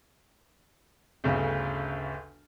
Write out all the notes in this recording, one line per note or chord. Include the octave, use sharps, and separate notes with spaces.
G1 D2 C#3